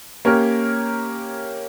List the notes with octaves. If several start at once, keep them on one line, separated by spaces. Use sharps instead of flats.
A#3 C#4 G4 A#4 C#5